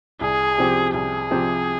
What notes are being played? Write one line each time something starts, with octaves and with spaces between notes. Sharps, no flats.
C2 G#4
C3 F3 C4 G4
C2 G#4
C3 F3 C4 G4